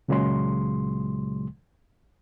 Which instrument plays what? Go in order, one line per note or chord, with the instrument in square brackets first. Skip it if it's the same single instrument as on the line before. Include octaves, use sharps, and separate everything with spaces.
[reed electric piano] C#2 A#2 C#3 F#3 G#3 C6